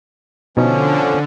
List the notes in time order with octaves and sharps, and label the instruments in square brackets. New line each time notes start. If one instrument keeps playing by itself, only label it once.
[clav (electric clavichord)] B2 D#4 C#5 [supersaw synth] D3 [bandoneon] F3 C#4